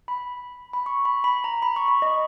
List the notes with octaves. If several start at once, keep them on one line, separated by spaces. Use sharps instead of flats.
B5
B5
C#6
B5
B5
A#5
B5
C#6
B5
D#5